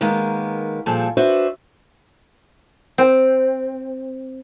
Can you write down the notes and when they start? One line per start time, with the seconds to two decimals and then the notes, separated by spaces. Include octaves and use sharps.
0.01 D#3 G#3 A#3 B3
0.86 A#2 F3 G3 G#4 A4
1.17 D4 F#4 B4 C5 E5
2.98 C4